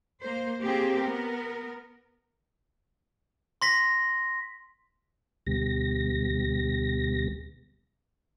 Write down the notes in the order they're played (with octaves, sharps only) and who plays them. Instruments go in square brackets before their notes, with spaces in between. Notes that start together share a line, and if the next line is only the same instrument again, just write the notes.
[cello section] A#3 C5
A#3 C4 G4 G#4
B3 A#4
[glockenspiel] C6 A#6 B6
[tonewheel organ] D2 B2 G3 A#6